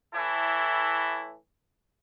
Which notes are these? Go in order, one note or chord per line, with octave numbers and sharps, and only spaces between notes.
A2 E3 E4 A4